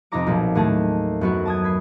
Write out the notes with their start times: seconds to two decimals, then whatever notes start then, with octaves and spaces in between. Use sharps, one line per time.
0.12 F2 C3 D#4 D#5 A#5 D6
0.26 B1 A#2 F3
0.55 D#2 A2 A3 G#4 A5
1.21 F#2 B3 F#4
1.45 A5 D#6 G#6
1.64 B5 G#6 C7